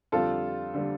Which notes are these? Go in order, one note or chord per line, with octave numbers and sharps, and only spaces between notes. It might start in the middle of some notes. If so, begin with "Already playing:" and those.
F2 D3 G3 F4 A4
D3 G3